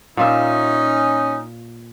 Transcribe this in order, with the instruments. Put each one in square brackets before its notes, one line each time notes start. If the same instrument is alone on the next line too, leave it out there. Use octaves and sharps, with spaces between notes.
[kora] A#2 F4 E5 [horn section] C#4 D#4